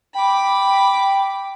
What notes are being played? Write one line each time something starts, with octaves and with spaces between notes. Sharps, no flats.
G5 B5 D6